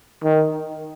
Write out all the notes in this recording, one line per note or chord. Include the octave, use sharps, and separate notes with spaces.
D#3